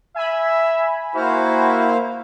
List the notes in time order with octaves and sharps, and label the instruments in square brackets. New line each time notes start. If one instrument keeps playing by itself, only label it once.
[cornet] E5 [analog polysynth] G#5 B5
[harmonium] A#3 C5 F5 [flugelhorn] E4 [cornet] F#4